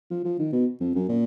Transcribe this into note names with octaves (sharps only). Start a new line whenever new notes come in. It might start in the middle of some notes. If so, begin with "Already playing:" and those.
F3
F3
D#3
B2
F2
F#2
A#2